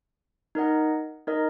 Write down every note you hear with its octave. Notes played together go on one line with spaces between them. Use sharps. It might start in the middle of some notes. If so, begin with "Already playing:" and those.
D#4 A#4 D#5 F#5
D#4 A#4 D#5